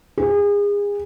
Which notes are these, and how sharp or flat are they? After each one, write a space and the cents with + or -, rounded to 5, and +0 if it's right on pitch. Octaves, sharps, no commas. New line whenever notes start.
G#4 -30